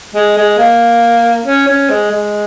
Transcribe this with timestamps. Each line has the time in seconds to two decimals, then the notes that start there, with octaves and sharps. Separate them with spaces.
0.14 G#3
0.37 G#3
0.58 A#3
1.45 C#4
1.68 C#4
1.90 G#3
2.11 G#3